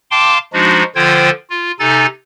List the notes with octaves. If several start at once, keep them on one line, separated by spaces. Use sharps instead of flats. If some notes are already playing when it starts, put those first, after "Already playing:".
F5 G5 A5 C6 D6
F3 G#3 D4 D#4 F#4
D3 F3 F4 C5 G5 G#6
F4
C3 D#4 A4 G#5 A#5 A6